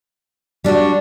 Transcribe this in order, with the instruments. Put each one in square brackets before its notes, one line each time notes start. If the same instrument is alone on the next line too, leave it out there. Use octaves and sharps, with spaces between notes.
[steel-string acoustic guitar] G3 D4 F#4